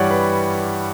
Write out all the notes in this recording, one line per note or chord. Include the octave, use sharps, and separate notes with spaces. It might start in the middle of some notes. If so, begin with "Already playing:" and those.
Already playing: G2 E3 G3 C#5 D5 F#5
B4